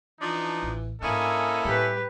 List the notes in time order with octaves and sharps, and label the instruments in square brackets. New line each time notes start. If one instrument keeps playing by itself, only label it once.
[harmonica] E3 [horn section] F3 D4 D#4
[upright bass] A1
[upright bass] G#2 D4 [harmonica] A#3 D#5 [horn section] C#4 E4 A4 [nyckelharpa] G#5
[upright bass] A2 G3 [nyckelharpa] G4 B4